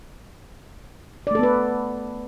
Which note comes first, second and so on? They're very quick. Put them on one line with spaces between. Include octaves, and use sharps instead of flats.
D5 A3 A4 B3 B4